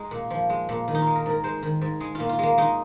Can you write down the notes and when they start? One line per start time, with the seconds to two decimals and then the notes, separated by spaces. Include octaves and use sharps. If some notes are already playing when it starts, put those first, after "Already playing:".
Already playing: G#3 D#4
0.11 A#2
0.30 F3
0.50 G#3
0.69 A#2
0.88 D#3
0.95 D#4
1.02 G#3 F4
1.15 A#4
1.26 G#2 A#4
1.44 G#3 C5
1.62 D#3
1.81 G#2
2.00 G#3 G#4
2.15 F4
2.20 A#2
2.29 F4
2.39 G#3 A#3
2.58 G#3 D#4